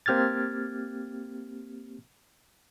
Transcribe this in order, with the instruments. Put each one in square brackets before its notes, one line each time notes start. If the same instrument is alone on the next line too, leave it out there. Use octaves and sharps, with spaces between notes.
[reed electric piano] A#3 C4 G4 F6 G#6 A6